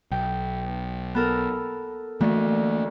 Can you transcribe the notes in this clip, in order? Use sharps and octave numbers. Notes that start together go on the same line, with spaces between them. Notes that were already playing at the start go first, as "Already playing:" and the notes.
B1 G5
B3 A4 A#4
D2 E3 A3 A#3